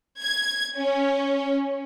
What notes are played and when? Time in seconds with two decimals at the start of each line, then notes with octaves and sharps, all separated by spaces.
0.21 G#6
0.78 C#4